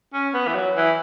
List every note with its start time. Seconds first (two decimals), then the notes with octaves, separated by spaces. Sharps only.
0.14 C#4
0.34 B3
0.47 E3
0.55 F#3
0.76 E3